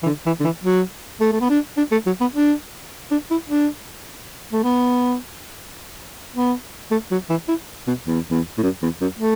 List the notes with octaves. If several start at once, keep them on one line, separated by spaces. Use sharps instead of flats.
E3
D3
E3
D3
E3
F#3
A3
A3
B3
D4
D4
A3
F#3
B3
D4
D4
E4
D4
A3
B3
B3
A3
F#3
E3
E4
B2
E2
E2
A2
F#2
E2
F#2
A3